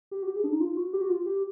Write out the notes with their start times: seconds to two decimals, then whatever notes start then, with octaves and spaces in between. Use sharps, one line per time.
0.11 G4
0.22 F#4
0.27 G4
0.36 G#4
0.44 D4
0.52 D#4
0.61 F4
0.77 F#4
0.93 G4
1.01 F#4
1.09 F4
1.26 G4